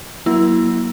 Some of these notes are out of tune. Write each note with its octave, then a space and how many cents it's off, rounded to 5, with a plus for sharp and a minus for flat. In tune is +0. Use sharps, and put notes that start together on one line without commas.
F#3 +0 A#3 +30 E4 +0